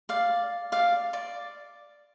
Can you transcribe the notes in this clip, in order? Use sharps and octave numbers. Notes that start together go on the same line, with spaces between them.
D5 F5
D5 F5
D5